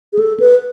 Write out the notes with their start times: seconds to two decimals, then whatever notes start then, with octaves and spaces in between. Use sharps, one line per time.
0.13 G#4
0.19 A4
0.40 B4